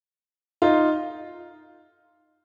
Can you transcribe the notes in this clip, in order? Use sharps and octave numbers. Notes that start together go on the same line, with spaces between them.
D#4 F4